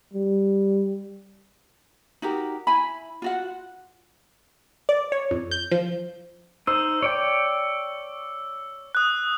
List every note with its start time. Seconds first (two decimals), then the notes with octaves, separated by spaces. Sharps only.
0.13 G3
2.22 D#4 F#4 G4 A#4
2.67 E4 G#5 B5
3.22 F4 F#4 F#5
4.89 D5
5.12 C#5
5.31 F2
5.51 G6
5.71 F3
6.67 D#4 C5 E6
7.02 C#5 D5 G5
8.95 D#6 F#6